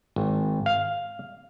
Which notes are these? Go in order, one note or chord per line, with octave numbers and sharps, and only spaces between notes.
G#1
F5